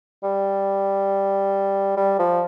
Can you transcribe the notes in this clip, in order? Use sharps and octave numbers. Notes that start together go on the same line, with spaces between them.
G3
G3
F3